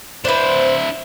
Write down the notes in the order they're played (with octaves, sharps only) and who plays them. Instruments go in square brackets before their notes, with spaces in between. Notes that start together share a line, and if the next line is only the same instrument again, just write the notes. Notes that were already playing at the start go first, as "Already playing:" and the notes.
[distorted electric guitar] D4 E4 [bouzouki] B4 C5